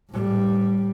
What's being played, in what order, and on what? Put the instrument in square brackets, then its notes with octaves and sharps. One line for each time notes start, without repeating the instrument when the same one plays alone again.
[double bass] A2 G3